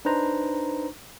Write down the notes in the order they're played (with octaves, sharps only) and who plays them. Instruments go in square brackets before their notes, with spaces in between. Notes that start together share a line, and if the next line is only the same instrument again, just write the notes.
[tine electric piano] D4 D#4 B4 C5 A#5